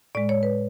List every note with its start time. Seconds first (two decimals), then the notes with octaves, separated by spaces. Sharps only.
0.15 A2 G#3 D5
0.29 C#5
0.43 B4